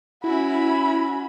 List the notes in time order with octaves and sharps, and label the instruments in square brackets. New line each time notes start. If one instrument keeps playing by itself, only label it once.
[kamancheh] C#4 F#4 [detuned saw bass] E4 [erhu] B5